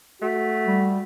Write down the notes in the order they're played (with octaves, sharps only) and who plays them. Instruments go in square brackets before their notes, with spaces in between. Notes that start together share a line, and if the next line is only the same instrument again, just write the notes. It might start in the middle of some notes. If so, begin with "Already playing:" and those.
[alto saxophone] A3 [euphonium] F#4
[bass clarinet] G3